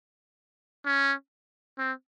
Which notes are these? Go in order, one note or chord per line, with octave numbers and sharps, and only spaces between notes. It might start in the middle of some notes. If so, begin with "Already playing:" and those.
C#4
C4